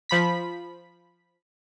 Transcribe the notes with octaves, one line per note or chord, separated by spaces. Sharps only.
F3 B5 B6